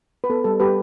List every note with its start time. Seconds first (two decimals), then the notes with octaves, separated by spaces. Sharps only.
0.24 B4
0.30 B3 A4
0.44 G3 A4
0.60 G3 G4 B4